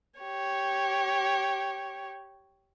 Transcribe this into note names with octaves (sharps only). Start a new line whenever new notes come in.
G4 C#5